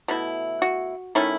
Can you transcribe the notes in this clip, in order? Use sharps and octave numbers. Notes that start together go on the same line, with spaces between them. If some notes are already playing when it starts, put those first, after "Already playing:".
B2 A3 E4
F#4
D#3 A3 C#4 E4